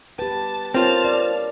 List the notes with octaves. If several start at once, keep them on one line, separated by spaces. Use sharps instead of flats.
G4 B4 A5
C4 F4 A#4 C#5 A5 F6
D5